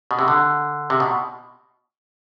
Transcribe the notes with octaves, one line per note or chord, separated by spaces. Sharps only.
B2
C3
D3
C3
B2